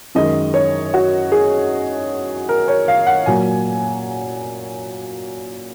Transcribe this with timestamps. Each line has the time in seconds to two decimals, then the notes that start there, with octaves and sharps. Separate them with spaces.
0.15 F#2 D#3 G#3 D#5
0.54 C#5
0.94 F#4
1.32 G#4
2.49 A#4
2.68 C#5
2.88 F5
3.07 F#5
3.26 A#2 F#3 G#5